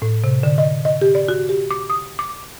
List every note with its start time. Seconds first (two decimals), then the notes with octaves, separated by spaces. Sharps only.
0.02 A2
0.24 C3
0.43 D3
0.58 D#5
0.85 D#5
1.01 G4
1.15 D5
1.28 F#4
1.49 G4
1.71 D6
1.90 D#6
2.19 D6